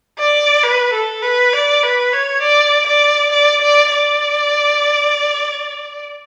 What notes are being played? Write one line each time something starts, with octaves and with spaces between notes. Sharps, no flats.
D5
B4
A4
B4
D5
B4
C#5
D5
D5
D5
D5
D5